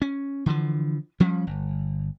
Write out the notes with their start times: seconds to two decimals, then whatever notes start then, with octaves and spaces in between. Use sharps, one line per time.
0.02 C#4
0.46 D3 E3 F3
1.20 F3 G3 C#4
1.47 G1